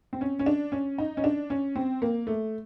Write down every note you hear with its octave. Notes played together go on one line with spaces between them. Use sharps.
C4
C#4
C#4
D4
C#4
D#4
C#4
D4
C#4
C4
A#3
A3